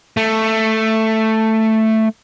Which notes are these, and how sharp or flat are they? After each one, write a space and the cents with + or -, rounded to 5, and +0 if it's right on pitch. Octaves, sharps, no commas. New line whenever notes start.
A3 +5